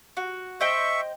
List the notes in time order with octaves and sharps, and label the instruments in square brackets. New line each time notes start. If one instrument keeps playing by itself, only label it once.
[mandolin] F#4
[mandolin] C5 D#5 G5 [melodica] E5 C#6